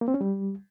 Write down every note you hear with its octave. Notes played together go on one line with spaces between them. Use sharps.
A#3
C4
C#4
G3